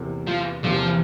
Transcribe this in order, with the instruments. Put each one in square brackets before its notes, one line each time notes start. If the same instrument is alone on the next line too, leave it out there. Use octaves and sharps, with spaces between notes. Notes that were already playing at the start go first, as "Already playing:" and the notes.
Already playing: [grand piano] E2 C3 E3 A#3
[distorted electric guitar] F3
[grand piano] E2 C3 E3 A#3 [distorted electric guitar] F3